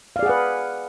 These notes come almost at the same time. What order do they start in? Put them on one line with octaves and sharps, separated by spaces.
F5 D5 G#4 F#5 B4